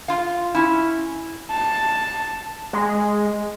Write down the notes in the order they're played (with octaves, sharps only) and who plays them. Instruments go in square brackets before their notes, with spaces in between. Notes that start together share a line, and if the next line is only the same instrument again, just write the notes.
[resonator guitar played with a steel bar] F4 F5
C#4 E4
[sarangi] A5
[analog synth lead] G#3